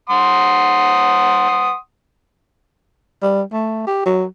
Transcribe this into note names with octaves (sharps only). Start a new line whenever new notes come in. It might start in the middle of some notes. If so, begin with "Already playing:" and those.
F#5 C6 D#6
G3
A3
G4
F#3